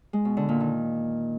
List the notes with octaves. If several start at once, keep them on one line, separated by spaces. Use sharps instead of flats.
G#3
B2
D3
A#2
D#3